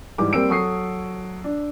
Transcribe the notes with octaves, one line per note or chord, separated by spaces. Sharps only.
G#2 E3 G3 D6
G3 A#3 C4 C5 E6 D7
F#3 A4 C#6 D#6 C7
D4